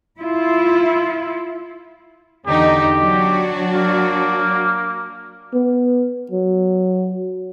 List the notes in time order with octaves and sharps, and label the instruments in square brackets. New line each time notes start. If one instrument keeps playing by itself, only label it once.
[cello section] E4 F4
[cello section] E2 D3 D#4 [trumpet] G4
[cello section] F#3 D4 F#4
[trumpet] A#3
[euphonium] B3
F#3